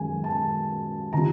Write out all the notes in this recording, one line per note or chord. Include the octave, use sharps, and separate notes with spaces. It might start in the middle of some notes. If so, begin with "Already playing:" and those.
Already playing: F#2 D#3 G#3 G#5
A5
D#3 G3 C4 F4 A#5